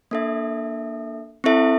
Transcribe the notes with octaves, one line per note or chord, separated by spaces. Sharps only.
A#3 D4 A4 E5
C4 E4 A4 E5